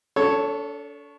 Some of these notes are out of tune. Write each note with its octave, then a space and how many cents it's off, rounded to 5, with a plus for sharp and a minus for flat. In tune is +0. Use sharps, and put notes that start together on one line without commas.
D4 -40 A4 +0 C#5 +0